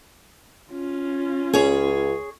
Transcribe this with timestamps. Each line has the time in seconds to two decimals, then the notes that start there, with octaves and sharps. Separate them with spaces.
0.71 C#4 F4
1.53 C#2 G#4 C#5